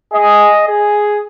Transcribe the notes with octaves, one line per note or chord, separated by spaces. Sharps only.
G#4 D#5
G#4